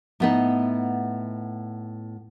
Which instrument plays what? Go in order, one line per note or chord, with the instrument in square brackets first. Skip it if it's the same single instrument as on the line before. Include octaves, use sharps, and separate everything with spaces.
[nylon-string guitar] A2 B3 D#4